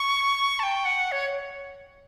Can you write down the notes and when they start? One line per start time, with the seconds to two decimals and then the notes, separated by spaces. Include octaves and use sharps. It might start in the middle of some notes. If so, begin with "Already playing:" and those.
Already playing: C#6
0.59 A5
0.63 G5
0.85 F#5
1.12 C#5